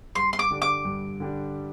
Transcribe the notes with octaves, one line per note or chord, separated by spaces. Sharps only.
G2 C6
C6
D6
D3 G3 D4
D6
G2
D3 G3 D4